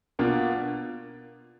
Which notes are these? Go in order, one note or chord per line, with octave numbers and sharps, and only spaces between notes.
B2 A#3 D4 F4